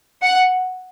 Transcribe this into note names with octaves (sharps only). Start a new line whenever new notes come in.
F#5